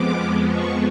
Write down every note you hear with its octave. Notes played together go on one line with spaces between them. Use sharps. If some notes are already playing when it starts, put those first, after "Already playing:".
Already playing: F2 F3 G#3 B3 D6
C#6